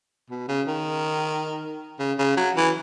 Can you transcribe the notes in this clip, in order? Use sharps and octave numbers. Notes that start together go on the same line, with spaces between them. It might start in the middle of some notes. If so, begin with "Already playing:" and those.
B2
C#3
D#3
C#3
C#3
F#3
E3